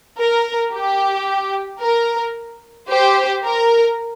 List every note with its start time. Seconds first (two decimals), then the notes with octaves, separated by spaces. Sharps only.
0.18 A#4
0.74 G4
1.81 A#4
2.89 G4 C5
3.44 A#4